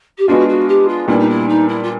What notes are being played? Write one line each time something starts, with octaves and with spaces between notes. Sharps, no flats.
G4
G#3 B3 D4 F4 F#4
F#4
G4
F4
A#2 G3 B3 D4 E4
D#4
E4
D#4
E4
F4